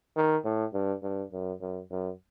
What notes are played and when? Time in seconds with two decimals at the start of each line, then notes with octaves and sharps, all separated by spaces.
0.17 D#3
0.45 A2
0.74 G2
1.03 G2
1.33 F#2
1.61 F#2
1.91 F#2